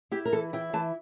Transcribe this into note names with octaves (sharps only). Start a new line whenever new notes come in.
E4 G4
A#4
E3 A4
E4 G5
E3 A5